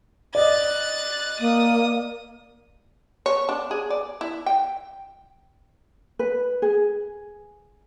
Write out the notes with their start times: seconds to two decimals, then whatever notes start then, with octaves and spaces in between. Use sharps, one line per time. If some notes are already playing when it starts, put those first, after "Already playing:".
0.35 D5 D#5 F#6 A6
1.40 A#3 D#6
3.26 C#5
3.49 D4
3.71 G#4
3.90 D5
4.21 E4
4.46 G5
6.19 B4
6.62 G#4